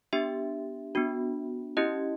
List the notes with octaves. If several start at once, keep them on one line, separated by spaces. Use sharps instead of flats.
B3 D4 G4 E5
B3 D4 F#4
C#4 E4 G4 D#5